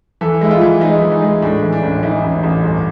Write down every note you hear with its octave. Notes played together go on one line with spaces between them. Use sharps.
E3 A4
G#3 E4
F4
E3
G#3 D#4
E3
D#4
G#3
A2 D4
E3
D4
A1
E3 D#4
A1
A1
G1